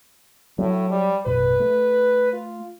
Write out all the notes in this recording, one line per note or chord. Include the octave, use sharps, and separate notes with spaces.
A2 F#3
G3
A1 F#2 B2 B4
A3
F4